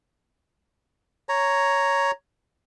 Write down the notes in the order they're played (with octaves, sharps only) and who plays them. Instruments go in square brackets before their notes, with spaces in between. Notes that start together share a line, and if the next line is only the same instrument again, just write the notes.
[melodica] C#5 A#5